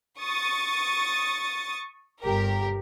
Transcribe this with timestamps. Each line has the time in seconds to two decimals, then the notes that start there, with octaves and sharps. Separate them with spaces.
0.20 C#6 D#6 A6
2.21 G1 G4 A#4